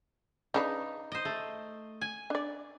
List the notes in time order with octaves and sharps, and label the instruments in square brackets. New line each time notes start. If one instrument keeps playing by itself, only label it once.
[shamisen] C#3 D4 B4 [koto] D#4
[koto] C5 D#5
A3
G#5
[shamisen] D4 D5